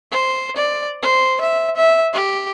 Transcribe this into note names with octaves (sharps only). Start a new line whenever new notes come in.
C5
D5
C5
E5
E5
G4